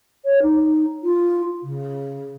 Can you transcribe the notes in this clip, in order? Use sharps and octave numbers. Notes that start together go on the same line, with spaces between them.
C#5
D#4
F4
C#3